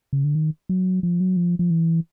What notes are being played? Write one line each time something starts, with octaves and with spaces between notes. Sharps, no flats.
C#3
D3
D#3
F#3
F3
F#3
F3
F3
E3